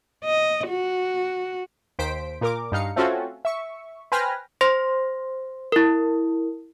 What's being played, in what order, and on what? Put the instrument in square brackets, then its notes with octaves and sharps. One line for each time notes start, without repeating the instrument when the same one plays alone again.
[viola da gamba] D#5
F#4
[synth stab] D#2 C5 B6 D7
A#2 A#4 D6
G2 D#4 F5 C#7
A3 C4 C#4 F4 F#4 A4
E5 C#6
B4 C5 G5 G#5 F6 A#6
[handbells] C5 C6 A#6
E4 A#4